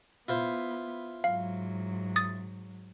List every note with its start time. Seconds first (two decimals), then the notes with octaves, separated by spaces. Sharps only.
0.28 B3 E4 F4 C5
1.24 G#2 F#3 F5
2.16 D#6 A6